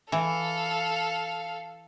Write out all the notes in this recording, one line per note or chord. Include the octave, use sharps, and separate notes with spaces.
E3 A4 F5